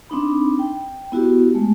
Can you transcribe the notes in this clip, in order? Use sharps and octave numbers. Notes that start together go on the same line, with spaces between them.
C4 D4 D#4 B5
G5
B3 E4 F#4 G4
G#3 A3